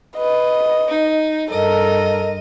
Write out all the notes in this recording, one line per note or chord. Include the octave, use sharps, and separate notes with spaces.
B4 D#5
D#4
G2 A4 A#4 D#5